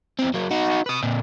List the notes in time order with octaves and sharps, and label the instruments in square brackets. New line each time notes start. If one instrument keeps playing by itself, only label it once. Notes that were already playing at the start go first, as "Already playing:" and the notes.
[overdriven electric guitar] E2 C4
F#3 A#3
D#4 F#4
B4 D#5
A#2 C4